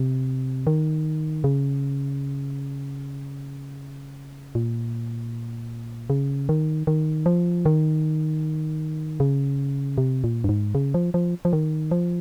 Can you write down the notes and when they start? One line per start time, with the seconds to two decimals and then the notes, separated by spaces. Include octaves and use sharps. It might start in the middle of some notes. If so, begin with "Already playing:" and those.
Already playing: C3
0.67 D#3
1.44 C#3
4.55 A#2
6.10 C#3
6.49 D#3
6.87 D#3
7.26 F3
7.66 D#3
9.20 C#3
9.98 C3
10.24 A#2
10.44 G2
10.49 G#2
10.75 C#3
10.94 F3
11.14 F3
11.45 F3
11.53 D#3
11.91 F3